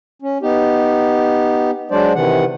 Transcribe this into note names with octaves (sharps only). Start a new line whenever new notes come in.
C#4
B3 D#4 G4
F#3 G#3 D4 C5 D5
C3 D#3 E3 F#5